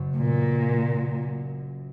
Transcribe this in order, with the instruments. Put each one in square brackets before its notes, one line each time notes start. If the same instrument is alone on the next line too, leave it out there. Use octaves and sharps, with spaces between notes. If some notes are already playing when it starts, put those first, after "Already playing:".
Already playing: [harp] F#1 F#2 C#3 F#3 C#4
[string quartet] A#2